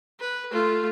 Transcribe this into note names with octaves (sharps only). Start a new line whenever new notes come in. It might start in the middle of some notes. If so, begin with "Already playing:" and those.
B4
A3 F4